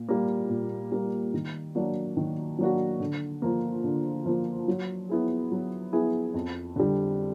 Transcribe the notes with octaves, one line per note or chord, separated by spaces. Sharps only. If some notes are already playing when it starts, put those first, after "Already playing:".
Already playing: A#2
G3 A#3
A#2
G3 A#3
D#3
F#3 A#3 D4 F#4
D#3
F#3 A#3 D4 F#4
D3
F3 A#3
D3
F3 A#3
F#3
B3 E4 G#4
F#3
B3 E4 G#4
F2
D3 G3